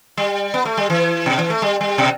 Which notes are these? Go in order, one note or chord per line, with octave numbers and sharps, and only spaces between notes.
G3
B3
A3
G3
E3
B2
E3
A3
G3
G3
B2